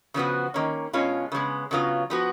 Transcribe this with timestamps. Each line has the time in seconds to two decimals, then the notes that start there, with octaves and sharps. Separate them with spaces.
0.14 C#3 F3 B3 F#4
0.54 D#3 A#3 C#4
0.93 B2 G#3 C#4 F4
1.32 C#3 G#3 B3
1.71 C#3 F#3 B3 F4
2.10 F3 B3 F#4